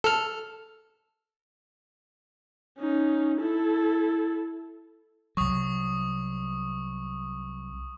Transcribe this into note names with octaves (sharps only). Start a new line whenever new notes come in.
A4 F6
C#4 D#4
E4 A4
C2 F#3 C#6 D#6